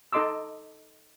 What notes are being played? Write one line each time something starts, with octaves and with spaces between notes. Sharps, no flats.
D#4 A4 D#5 C6 D6 E6